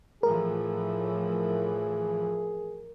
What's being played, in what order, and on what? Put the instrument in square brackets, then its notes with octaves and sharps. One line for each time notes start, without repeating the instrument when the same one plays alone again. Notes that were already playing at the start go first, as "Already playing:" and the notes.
[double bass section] A2 E3 F3 [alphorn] G#4 [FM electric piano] A#4